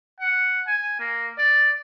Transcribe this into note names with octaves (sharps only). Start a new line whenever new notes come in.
F#5
G#5
A#3
D5